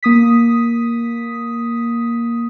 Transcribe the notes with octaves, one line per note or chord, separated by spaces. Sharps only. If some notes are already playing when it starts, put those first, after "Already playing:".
A#3 D#6 B6